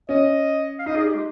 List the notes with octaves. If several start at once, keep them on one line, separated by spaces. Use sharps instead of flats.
C#4 D#5
F5
D#4 D#5
G#4
G4
G#3